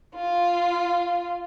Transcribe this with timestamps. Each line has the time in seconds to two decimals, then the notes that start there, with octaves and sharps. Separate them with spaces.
0.15 F4